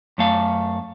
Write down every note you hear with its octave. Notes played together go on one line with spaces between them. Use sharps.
F#2 A3 F5